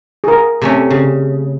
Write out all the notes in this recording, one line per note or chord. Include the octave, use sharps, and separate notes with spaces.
G#4 A#4
C3 A3 C#4
C#3